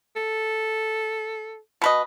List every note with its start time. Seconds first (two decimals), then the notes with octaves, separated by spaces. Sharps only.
0.16 A4
1.82 B2 B4 D#5